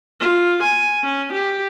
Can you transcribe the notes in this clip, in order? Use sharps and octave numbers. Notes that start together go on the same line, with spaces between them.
F4
G#5
C#4
G4